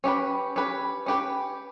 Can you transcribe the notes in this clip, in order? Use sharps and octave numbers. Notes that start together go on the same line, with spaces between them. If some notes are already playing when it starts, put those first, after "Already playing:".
C#4 G4 B4
C#4 G4 B4
C#4 G4 B4